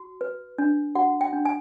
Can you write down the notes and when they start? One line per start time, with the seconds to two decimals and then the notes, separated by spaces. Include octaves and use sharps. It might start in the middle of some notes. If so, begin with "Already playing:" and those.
Already playing: F#4
0.21 B4
0.58 D4
0.95 F#4 F#5
1.21 G5
1.33 D4
1.45 G#5